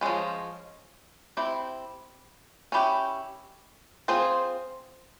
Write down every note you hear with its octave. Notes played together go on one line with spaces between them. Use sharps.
F3 G#3 C#4
C4 E4 G4
C#4 E4 G4
C4 F4 G#4 C5